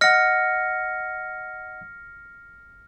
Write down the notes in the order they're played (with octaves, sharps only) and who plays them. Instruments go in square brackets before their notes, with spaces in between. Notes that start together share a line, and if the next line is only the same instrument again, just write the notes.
[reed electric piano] D#5 F#5 [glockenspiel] F6 A#6 C#7